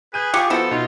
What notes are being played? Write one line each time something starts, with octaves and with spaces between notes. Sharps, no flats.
G#4 B4 G6 D#7
F4 G4 F5 C#6
F3 B3 E4 F#4 A4
B2 D#4 F4